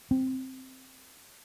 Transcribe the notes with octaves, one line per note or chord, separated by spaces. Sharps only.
C4